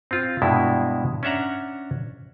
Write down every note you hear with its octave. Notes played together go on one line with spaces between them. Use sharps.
C4 F4
G2 B2 G#3 E4 G4
C#4 D4 E5 F#5 A#5